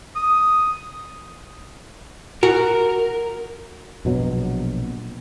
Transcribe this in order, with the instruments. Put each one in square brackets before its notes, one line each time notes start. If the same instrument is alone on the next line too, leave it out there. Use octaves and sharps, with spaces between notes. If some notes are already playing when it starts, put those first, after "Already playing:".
[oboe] D#6
[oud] F#4 [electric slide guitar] A#4
[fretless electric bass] A#1 B2 F#3